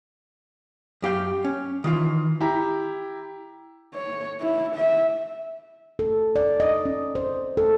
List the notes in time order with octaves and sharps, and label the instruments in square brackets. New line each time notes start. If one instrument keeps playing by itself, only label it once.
[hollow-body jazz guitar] F#2 G4 F5 G5
C#4
D#3 E3 F4
[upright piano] E4 G4 A#5
[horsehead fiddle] C#5
E4
E5
[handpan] A4
D5
D#5
C#4
C5
A4